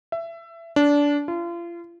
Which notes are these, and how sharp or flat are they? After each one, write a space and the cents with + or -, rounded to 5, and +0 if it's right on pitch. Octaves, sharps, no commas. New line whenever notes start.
E5 +20
D4 -20
F4 -35